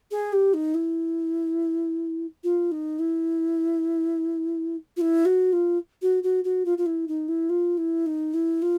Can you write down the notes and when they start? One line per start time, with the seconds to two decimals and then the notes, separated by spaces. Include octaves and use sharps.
0.11 G#4
0.32 G4
0.54 D#4
0.74 E4
2.44 F4
2.71 D#4
2.99 E4
4.97 F4
5.01 E4
5.25 F#4
5.53 F4
6.02 F#4
6.23 F#4
6.44 F#4
6.65 F4
6.78 F4
6.86 E4
7.08 D#4
7.28 E4
7.49 F4
7.78 E4
8.06 D#4
8.34 E4
8.62 F4